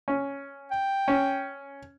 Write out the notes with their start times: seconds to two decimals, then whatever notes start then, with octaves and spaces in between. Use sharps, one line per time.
0.08 C#4
0.71 G5
1.08 C#4